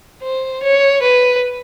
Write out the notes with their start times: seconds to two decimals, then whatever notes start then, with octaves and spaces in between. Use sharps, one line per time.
0.23 C5
0.63 C#5
1.02 B4